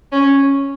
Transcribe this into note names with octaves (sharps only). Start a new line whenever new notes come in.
C#4